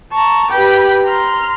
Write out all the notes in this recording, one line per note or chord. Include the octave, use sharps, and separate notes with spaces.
A5 A#5 C#6
G4 B4 G5 B5 D6
A#5 C6 F6